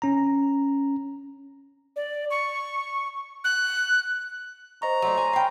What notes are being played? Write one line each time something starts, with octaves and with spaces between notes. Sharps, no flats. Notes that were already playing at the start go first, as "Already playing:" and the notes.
C#4 A#5
D5
C#6
F#6
C5 D#5 A#5 C#6
F#3 A3 D4 C#5 C6 C#6
G#5
F5 G5 G#5 B5